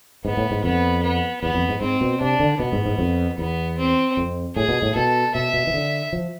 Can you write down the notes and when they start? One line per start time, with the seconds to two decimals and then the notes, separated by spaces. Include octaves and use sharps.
0.25 G#2 B3
0.37 A2
0.51 G#2
0.64 F2 B3
1.03 B3
1.41 E2 B3
1.55 F2
1.69 G#2
1.81 G#2 C4
2.01 B2
2.21 C3 D4
2.40 D3
2.60 B2 B3
2.72 G#2
2.86 G#2
2.98 F2
3.38 E2 B3
3.78 C4
4.17 F2
4.56 A2 G#4
4.69 B2
4.82 A2
4.95 B2 A4
5.35 B2 E5
5.54 B2
5.67 E3
5.73 D3
6.13 F3